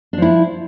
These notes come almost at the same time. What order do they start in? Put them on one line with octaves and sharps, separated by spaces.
D4 F3 E4